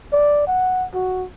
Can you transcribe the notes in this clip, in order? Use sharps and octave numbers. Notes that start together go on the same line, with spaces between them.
D5
F#5
F#4